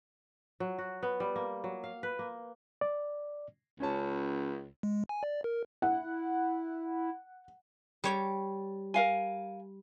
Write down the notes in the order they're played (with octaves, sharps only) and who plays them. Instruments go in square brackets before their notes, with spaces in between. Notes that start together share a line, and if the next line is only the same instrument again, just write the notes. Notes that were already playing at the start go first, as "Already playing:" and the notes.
[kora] F#3
F#4
B3
G3
A#3
F#3
F5
B4
A#3
[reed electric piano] D5
[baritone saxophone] C#2 [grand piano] C#4 C#5 A5
[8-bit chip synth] G#3
G#5
D5
A#4
[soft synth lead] E4 [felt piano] F#5
[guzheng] G3 C#5 G5
[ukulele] A#4 F5 G#5